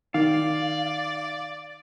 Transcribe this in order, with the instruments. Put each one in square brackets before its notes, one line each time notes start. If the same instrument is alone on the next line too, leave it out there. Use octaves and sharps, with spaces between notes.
[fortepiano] D#3 [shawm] D5 [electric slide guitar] F5